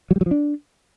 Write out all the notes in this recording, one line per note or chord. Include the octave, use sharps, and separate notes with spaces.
F#3
G3
F#3
F3
D4